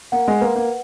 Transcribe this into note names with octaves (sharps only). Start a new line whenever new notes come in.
A#3 F#5
G#3
A#3 B4
A#3